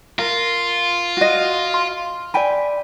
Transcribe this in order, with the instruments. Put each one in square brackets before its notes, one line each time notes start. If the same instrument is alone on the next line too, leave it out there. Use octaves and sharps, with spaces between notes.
[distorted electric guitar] F4 [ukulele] A#4
[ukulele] F#4 D#5
[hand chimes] C6
[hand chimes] D5 B5 [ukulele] E5 G5 G#5